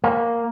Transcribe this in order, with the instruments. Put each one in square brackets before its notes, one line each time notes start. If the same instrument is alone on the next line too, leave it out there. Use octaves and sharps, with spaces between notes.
[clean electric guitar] A#3